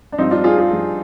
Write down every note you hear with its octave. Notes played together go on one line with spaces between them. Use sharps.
D4
G2 F3 C4 D#4
D4 F4
F4 G#4
F4 G#4
G2 F3